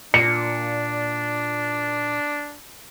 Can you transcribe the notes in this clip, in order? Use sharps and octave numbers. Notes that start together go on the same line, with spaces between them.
A#2 D4 C#7